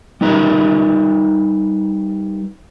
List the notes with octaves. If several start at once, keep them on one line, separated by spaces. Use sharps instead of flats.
G3 D#4 A#4 B4 E5